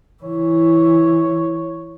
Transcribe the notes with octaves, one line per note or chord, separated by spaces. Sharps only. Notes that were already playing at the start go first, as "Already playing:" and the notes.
E3 C#5